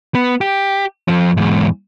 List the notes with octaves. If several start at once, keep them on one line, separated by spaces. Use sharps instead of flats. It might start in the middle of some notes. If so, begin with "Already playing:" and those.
B3
G4
F2 F3
E2 G#2